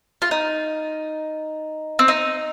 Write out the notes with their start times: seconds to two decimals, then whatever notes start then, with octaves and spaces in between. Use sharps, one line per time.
0.22 F4
0.31 D#4
1.99 C4
2.08 D#4